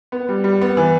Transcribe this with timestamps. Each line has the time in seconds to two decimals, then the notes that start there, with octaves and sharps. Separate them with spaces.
0.12 B3
0.29 G3
0.44 G3
0.61 B3
0.77 E3